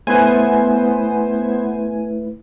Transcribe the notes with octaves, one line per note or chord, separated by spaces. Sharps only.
A3 B3 E4 B4 C5 G#5